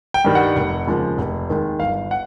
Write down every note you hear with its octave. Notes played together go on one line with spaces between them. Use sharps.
G5
G2 D#3 G3
F#5
F1
D#2 C#3 F3 G#3
F1
D#2 D#3 G#3
G1 F5
F#5